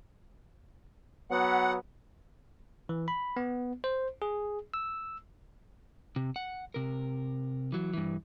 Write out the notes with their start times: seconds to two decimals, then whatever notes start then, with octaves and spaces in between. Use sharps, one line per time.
1.31 F#3 B3 F#5
2.89 E3
3.08 B5
3.37 B3
3.84 C5
4.22 G#4
4.74 E6
6.16 C3
6.36 F#5
6.74 C3 A#4
7.72 E3 F#3
7.93 G2 E3